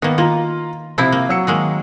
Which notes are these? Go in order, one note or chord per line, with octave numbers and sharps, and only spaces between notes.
D#3 A#3 B3
A#3 F4 A#5
C3 F3 C4 E4
A#3
F#3 E6 C#7
D#3 G#3 A#3